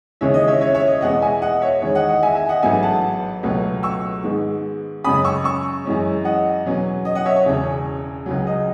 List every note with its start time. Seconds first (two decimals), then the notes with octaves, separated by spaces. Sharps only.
0.21 D#2 C#3 E3 G#3 C#4 C#5 E5
0.34 D#5
0.48 C#5 E5
0.61 C#5 E5
0.74 C#5 E5
0.87 D#5
1.01 E2 B2 G#3 B3 D#5 F#5
1.22 E5 G#5
1.42 D#5 F#5
1.62 C#5 E5
1.82 E2 D#3 G#3 C#5
1.95 D#5 F#5
2.09 D#5 F#5
2.23 E5 G#5
2.35 E5 G#5
2.49 D#5 F#5
2.63 A1 G#2 F#3 B3 E5 G#5
2.83 F#5 A5
3.43 C#2 B2 F#3 A3
3.83 C#6 E6
4.24 G#2 D#3 G#3 B3
5.04 F#2 C#3 G#3 C#4 B5 D#6
5.24 C#6 E6
5.44 C#6 E6
5.85 F#2 E3 G#3 C#4
6.25 D#5 F#5
6.65 E2 B2 F#3 C#4
7.05 D#5
7.15 D#5 F#5
7.25 C#5 E5
7.36 C#5
7.46 E1 E2 C#3
8.26 C#2 C#3 F#3
8.47 D#5